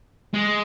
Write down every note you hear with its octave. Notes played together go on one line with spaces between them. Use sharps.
G#3